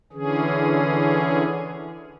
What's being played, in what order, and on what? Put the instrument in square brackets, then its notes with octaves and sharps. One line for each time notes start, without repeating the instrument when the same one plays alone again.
[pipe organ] D3 E3 C#4 G#4